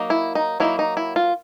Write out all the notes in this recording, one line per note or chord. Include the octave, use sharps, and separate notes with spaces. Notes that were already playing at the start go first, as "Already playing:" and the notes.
Already playing: F#3 A#3 D#4
E4
D#4
F#3 A#3 D#4 E4
D#4
E4
F4